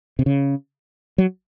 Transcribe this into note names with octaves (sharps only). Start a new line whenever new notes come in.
C3
C#3
F#3